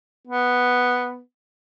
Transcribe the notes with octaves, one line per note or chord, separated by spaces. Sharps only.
B3